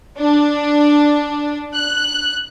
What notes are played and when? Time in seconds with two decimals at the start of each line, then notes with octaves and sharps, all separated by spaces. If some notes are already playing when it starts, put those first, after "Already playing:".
0.18 D4
1.75 F#6